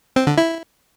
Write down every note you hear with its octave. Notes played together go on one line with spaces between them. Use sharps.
C4
D3
E4